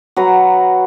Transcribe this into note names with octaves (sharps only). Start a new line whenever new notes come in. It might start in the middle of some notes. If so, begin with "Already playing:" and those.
F#3 B4 A#5